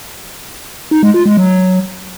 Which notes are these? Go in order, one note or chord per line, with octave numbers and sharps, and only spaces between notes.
D#4
G#3
F4
G#3
F#3